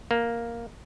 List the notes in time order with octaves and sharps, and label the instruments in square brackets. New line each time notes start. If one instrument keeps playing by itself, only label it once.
[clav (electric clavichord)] A#3